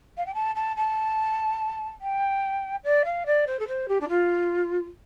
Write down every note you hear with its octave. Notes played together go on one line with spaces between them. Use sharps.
F5
G5
A5
A5
A5
G5
D5
F5
D5
C5
A4
C5
G4
D4
F4